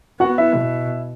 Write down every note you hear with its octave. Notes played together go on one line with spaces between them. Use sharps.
B3 F#4 F#5
E4 E5
B2